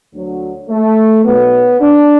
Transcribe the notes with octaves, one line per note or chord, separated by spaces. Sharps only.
D2 D3 F#3
A3
B1 B2 F#3 B3
D4